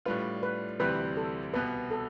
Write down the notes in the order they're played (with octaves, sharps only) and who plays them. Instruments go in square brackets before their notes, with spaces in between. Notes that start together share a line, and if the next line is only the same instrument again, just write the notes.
[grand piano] A2 G3 D4 F4 [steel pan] B4
[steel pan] B4
[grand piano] D2 C3 E3 G3 C4 [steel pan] B4
[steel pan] A4
[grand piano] C2 B2 B3 [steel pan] B4
[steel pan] A4